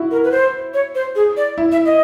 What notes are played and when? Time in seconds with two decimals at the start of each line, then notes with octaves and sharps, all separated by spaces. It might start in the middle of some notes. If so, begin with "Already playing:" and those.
Already playing: E4 F#4
0.11 A#4
0.24 B4
0.32 C5
0.74 C#5
0.95 C5
1.16 G#4
1.37 D5
1.58 E4
1.72 E5
1.86 D#5